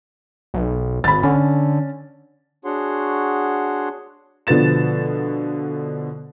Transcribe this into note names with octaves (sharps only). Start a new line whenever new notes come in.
B1
G#1 B5 A6
D3 C#4
D4 F#4 G#4 C#5 F#5 C6
B2 D3 F3 B3 A6 E7